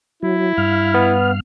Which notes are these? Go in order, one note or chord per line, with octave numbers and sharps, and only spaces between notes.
F#3 E4
G2 F5 F6
B3